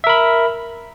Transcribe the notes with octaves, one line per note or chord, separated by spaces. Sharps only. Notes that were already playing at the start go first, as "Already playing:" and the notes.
A#4 E5 B5